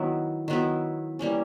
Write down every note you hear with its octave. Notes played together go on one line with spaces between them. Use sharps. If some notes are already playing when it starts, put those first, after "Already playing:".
Already playing: D#3 F#3 B3 E4
D#3 F#3 B3 E4
E3 G3 A#3 C#4